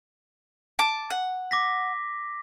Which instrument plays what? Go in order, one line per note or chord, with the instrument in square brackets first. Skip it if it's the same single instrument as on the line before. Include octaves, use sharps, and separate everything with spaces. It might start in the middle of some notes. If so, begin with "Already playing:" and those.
[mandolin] A5 D6
F#5
[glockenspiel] D6 A#6 B6